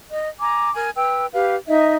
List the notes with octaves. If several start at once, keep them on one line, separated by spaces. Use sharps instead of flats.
D#5
G#5 A#5 D6
A#4 G#5
B4 G5 E6
G4 B4 F5
D#4 D#5 E5